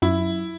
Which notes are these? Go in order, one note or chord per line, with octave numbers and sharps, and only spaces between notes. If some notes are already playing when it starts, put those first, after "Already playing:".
F#2 E4